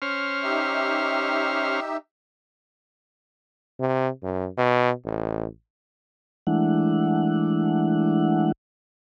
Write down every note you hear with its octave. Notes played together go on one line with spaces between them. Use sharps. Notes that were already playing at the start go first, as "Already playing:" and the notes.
C#4 C5 F6
D#4 G4 E5
C3
F#2
B2
A1
E3 G#3 A3 D4 E4 F#5